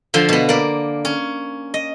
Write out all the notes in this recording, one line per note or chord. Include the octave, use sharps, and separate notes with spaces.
D3 F3 C6
B2 B3
A#3 D5
C#4
D#5